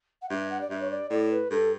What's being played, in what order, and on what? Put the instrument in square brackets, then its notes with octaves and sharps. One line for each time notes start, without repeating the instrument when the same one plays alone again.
[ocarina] F#5
[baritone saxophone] G2 [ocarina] E5
[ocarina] F#5
D5
[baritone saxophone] G2 [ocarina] E5
[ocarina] C#5
D5
[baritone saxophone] A2 [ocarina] D5
[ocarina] B4
[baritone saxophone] G2 [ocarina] A4